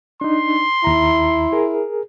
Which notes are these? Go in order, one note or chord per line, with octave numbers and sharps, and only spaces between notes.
D4 D#4 C6
D#2 E4 A#5
G#4 A#4